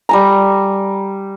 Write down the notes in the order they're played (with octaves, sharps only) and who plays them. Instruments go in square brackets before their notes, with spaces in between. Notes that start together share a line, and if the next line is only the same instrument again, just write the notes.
[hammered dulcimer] G3 G#5 A#5